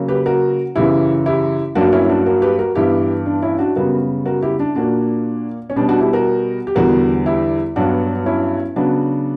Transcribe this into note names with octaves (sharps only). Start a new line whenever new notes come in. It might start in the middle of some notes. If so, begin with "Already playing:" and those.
Already playing: C#3 F#3 A#3
G4 B4
F#4 A#4
F#2 C#3 E3 E4 G4
E4 G4
G2 F#3 A#3 D4 F#4
C#4 E4
E4
D4 F#4
F#4 A#4
G4 B4
F#4 A#4
G2 E3 B3 E4 G4
D4
C#4 E4
D4 F#4
F#2 C#3 G3 B3 F#4 A#4
F#4 A#4
E4 G4
D4
A#2 A#3 D4 F#4
C#4
B2 G3 B3 D4
D4 F#4
E4 G4
F#4 A#4
G4
E2 D3 G3 F#4 A#4
E4 G4
G2 F#3 B3 D4 F#4
C#4 E4
C#3 F#3 B3 D4 F#4